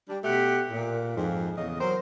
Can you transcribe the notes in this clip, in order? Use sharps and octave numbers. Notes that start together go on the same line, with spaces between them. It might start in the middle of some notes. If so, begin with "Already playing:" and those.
G3 D4
B2 A3 G4 F#5
A#2
F2 G#2
E2 C#3 D#5
F#3 A#4 C5